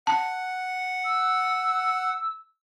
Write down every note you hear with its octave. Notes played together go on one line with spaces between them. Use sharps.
F#5 A5
E6